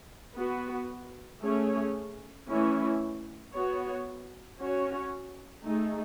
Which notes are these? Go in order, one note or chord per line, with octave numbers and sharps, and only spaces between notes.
B3 F#4 B4
A3 C#4 G#4 C#5
E3 A3 C#4 E4
B3 F#4 C#5
C#4 F#4 C#5
A3 D#4 G#4